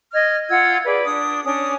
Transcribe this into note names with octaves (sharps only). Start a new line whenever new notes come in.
D#5 F6 G#6
F4 F#5 E6 G#6
G#4 B4 D5
D4 D#6
C#4 D4 D#6